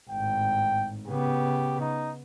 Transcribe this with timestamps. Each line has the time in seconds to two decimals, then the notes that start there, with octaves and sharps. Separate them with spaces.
0.10 G#1 A2 G5
1.08 C#3 B3 G4
1.81 D#4